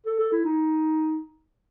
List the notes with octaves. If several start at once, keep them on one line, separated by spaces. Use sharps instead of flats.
A4
A4
E4
D#4